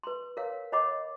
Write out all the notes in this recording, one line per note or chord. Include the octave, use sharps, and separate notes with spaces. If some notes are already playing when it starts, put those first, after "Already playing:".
B4 C6
A#4 C#5 F5
C#5 D#5 F#5 B5 D6